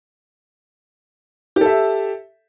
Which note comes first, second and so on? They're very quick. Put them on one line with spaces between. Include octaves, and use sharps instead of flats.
G4 A4 E5